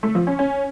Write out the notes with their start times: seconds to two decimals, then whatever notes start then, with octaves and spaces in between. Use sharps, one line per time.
0.03 A3
0.15 F3
0.27 C#4
0.39 C#4